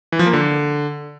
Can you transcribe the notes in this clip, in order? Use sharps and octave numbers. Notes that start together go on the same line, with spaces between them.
E3
F3
A#3
D3